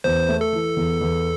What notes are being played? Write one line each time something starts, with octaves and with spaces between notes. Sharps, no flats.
E2 C5
A3
A4
E3
E2
E2